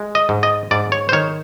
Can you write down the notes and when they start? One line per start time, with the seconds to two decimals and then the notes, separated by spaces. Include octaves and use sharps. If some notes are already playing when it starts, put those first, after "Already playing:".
Already playing: G#3
0.15 D#5
0.29 G#2
0.43 D#5
0.71 G#2 D5
0.92 C#5
1.09 C5
1.12 D#3 C#5